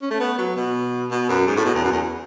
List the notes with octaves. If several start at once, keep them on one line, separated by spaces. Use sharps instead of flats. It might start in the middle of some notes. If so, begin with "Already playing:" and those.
C#4
A3
B3
F#3
B2
B2
F#2
G#2
A2
B2
E2
F#2
E2